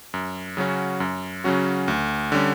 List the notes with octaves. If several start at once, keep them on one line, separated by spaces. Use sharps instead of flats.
F#2
C#3 F#3 C#4 F#4
F#2
C#3 F#3 C#4 F#4
D2
D3 G3 C#4